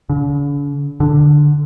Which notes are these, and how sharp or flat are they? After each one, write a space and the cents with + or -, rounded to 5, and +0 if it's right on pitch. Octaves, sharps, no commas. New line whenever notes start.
D3 -45
D3 +5